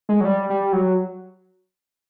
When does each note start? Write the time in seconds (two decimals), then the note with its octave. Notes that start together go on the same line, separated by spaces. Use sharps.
0.09 G#3
0.21 F#3
0.25 G3
0.50 G3
0.73 F#3